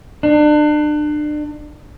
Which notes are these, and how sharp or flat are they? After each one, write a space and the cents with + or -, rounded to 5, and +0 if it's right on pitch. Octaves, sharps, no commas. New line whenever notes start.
D4 +35